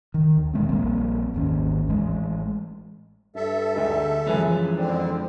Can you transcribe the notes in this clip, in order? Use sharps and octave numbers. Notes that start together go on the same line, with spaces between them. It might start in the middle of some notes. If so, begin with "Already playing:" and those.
D#3
D#2
B2 D#3 G#3 C4
A#1 G3 A#3 C4
G#1 D#2 C#4
A1 G#3
G2 A4 E5
D2 G#3 D#4
F#2 C#3 E3 F3 G#3 B4 G#5
F2 D3 C4 D4 C5